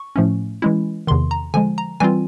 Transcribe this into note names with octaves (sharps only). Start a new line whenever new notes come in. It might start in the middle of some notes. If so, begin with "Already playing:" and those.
Already playing: C#6
A2 F3 A3 C#4
E3 G#3 C#4 E4
E2 C3 D#3 C6
A#5
D3 F3 G#3 G#5
A#5
E3 G3 C4 F4 G#5